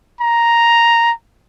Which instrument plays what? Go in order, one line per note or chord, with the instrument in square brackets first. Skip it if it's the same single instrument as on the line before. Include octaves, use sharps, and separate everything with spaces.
[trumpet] A#5